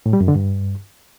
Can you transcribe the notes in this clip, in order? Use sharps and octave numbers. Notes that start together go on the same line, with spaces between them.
A2
G3
F#2
D3
G2